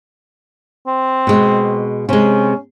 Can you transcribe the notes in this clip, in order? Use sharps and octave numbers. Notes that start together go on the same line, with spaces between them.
C4
B2 G#3
C3 G#3 C#4